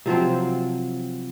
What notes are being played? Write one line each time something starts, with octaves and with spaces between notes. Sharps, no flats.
C3 F3 F#3 C4